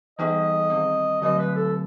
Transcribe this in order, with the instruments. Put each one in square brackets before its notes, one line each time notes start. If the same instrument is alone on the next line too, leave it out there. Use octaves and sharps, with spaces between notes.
[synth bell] E3 G3 B3 D#4 G#4 [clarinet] D#5
[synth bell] D#3 G3 C4
[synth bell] D3 F#3 A3 C4 [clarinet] D#5
[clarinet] B4
A4